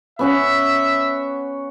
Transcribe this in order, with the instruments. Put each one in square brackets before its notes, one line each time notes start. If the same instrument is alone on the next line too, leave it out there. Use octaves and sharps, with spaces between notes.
[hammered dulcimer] B3 C#4 F#5 [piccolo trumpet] E5